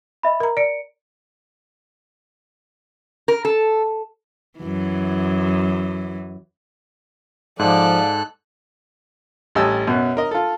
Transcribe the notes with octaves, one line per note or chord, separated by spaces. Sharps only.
D#5 E5 B5
A#4 A#5
D5 C#7 D7
A#4
A4
F#2 E3
G#2 F3 A4 D5 F5 F#6
A1 G3 D#5 G#5 A5 E6
F#2 B2
A#4 D#5
F4 A4